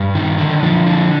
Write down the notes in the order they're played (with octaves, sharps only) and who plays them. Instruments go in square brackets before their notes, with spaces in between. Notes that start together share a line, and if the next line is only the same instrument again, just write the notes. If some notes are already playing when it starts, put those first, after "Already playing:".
Already playing: [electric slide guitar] G2
D#3
D3
F3
D3